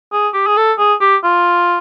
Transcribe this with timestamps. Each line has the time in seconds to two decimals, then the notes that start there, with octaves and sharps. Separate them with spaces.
0.13 G#4
0.34 G4
0.47 G#4
0.57 A4
0.78 G#4
1.01 G4
1.24 F4